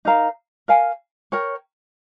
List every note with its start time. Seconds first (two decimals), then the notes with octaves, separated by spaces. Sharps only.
0.05 D#4 A#4 F5 A#5
0.68 A#4 F5 G#5
1.32 A#4 C#5 G5